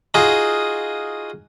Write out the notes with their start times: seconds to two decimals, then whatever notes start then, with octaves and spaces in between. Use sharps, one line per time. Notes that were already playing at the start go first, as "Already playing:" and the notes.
0.14 D#4 F4 F#4 G#4